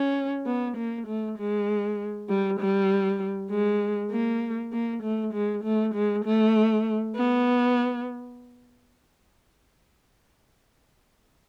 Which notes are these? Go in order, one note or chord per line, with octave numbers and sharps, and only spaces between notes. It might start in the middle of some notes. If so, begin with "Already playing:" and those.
Already playing: C#4
B3
A#3
A3
G#3
G3
G3
G#3
A#3
A#3
A3
G#3
A3
G#3
A3
B3